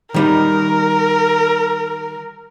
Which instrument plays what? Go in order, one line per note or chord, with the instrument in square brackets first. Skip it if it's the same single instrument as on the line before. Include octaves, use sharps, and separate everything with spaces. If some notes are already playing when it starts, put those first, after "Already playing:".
[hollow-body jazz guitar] D#3 G3 D#4 [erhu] A#4